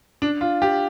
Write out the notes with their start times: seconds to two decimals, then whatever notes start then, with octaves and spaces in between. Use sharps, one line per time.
0.22 D4
0.41 F4
0.62 G4